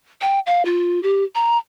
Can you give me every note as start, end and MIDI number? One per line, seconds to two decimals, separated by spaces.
0.21 0.39 79
0.46 0.65 77
0.65 1.01 65
1.03 1.24 67
1.35 1.58 82